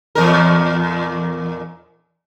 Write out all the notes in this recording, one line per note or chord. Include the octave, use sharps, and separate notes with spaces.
E2 A#2 A#4